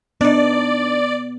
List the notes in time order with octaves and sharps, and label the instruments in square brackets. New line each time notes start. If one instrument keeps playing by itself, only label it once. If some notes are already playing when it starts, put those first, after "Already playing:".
[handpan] B3 [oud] D4 D#4 [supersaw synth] D5